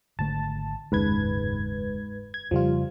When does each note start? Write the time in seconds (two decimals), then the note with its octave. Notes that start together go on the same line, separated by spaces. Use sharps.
0.19 G#1 D3 A3 A5
0.92 F#1 D#2 G#2 C#4 B4 G#6
2.34 G#6
2.51 F2 C#3 F3 G3 F4